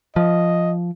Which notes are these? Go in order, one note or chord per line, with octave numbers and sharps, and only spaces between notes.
F3 D#5